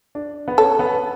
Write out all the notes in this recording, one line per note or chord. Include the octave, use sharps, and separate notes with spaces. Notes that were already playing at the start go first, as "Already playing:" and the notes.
D4
B3
C#4 A4
B3